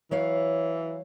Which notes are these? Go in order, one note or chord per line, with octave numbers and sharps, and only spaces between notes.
E3 F#3 C#5 F5